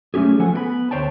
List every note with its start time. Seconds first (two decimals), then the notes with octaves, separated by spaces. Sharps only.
0.14 F#3 A3 C#4 G4 G#4
0.39 F3 A4 F#5 G#5
0.54 B3 G5 B5
0.91 D2 C5 C#5 G5 A5